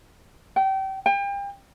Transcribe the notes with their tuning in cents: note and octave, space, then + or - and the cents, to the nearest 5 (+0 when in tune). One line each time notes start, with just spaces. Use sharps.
G5 -30
G5 +35